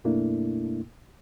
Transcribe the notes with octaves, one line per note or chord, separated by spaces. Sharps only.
F#2 B2 A3 A#3 D4 E4